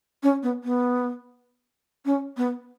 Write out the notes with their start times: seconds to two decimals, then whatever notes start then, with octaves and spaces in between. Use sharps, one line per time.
0.23 C#4
0.43 B3
0.64 B3
2.05 C#4
2.37 B3